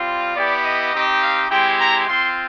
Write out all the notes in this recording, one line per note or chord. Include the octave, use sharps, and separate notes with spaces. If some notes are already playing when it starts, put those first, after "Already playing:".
Already playing: G3 C4 F4
B3 E4 G4 D5
D#5
C4 D#4 G4
F5
G#3 C4 E4 G4 G5
A#5
C4 F4 C6